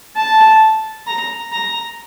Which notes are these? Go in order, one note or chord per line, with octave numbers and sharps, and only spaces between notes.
A5
A#5
A#5